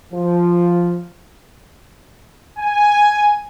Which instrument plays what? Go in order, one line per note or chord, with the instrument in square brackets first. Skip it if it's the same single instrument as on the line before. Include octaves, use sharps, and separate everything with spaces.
[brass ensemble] F3
G#5